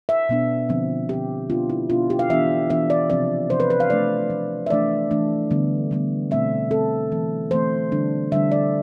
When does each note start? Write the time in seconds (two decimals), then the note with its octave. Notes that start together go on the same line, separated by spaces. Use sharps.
0.09 E5
0.29 B2 B3 D4
0.69 D3 F3 C4
1.09 D3 F3 C4 G4
1.50 B2 B3 D4 F4
1.70 E4
1.90 B2 B3 D4 F4
2.10 G4
2.19 F5
2.30 E3 B3 D4 E5
2.70 E3 B3 D4 E5
2.90 D5
3.10 C3 F3 C4 D5
3.50 C3 F3 C4 C5
3.60 B4
3.70 B4
3.80 F5
3.90 F3 A3 D4 D5
4.30 F3 A3 D4
4.66 E5
4.70 E3 A3 D4 D5
5.11 E3 A3 D4
5.51 D3 G3 B3
5.91 D3 G3 B3
6.31 B2 A3 C4 E5
6.71 B2 A3 C4 A4
7.12 E3 A3 C4
7.51 E3 A3 C4 C5
7.92 D3 G3 D4
8.32 D3 G3 D4 E5
8.52 D5